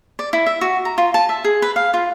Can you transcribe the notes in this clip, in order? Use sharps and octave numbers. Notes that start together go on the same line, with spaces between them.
D5
E4
E5
F#4
A#5
F4
A5
E5
G#4
B4
F5
F4